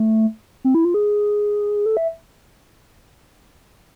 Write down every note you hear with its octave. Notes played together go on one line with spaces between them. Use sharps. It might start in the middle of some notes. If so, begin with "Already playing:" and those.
Already playing: A3
C4
E4
F4
G#4
A4
E5